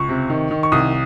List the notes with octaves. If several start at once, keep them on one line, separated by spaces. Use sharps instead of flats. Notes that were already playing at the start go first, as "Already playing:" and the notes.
Already playing: C#2 C#6
C3
D#3
D#3
C#6
C2 D#6